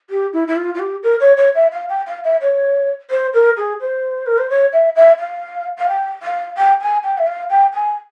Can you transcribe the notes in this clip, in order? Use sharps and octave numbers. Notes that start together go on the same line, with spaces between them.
G4
E4
E4
F4
F4
G4
A#4
C#5
C#5
E5
F5
G5
F5
E5
C#5
C5
A#4
G#4
C5
A#4
C5
C#5
E5
E5
F5
F5
G5
F5
G5
G#5
G5
E5
F5
G5
G#5